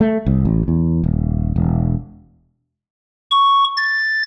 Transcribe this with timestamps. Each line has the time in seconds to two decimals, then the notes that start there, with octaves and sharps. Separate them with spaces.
0.01 A3
0.26 C2
0.45 A1
0.68 E2
1.04 D#1
1.56 E1
3.31 C#6
3.77 A6